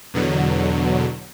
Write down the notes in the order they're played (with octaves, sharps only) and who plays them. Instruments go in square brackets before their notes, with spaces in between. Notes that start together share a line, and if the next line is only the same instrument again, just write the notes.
[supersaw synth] E2 B2 D3 F#3